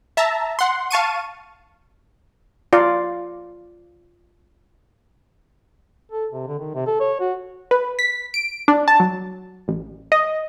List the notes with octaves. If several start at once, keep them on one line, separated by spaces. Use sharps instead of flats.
E5 A5 A#5
F#5 C6
F5 A5 C#6 D#7
F4 D5 F5
A4
C3
D3
D#3
C3
A4
C#5
F#4
B4
B6
D7
D4
A5
F#3
A1
D#5